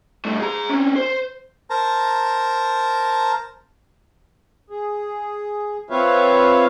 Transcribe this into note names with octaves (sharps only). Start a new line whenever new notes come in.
G2 A3
G#4 A#5
C4 C#4
C5
A#4 C5 A5 A#5
G#4
C4 F4 B4 C#5 E5 F5